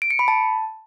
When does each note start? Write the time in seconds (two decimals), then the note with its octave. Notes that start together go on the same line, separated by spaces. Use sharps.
0.02 D7
0.10 C#7
0.19 B5
0.28 A5